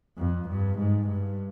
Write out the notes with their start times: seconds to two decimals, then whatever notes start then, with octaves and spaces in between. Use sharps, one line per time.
0.18 F2
0.49 G2
0.78 G#2
1.07 G2